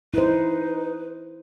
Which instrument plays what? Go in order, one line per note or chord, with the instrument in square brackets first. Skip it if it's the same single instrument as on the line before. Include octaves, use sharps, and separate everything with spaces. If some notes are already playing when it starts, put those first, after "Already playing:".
[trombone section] D#4 [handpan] E4 C5 [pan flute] B4